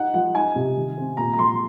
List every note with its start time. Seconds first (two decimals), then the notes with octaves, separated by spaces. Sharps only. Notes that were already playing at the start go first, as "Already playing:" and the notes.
Already playing: D#4 F#5
0.14 F3 F#5
0.34 D#4 G#5
0.55 C3
0.76 D#3
0.97 C4
1.17 A#2 A#5
1.33 A#5
1.38 F3 C6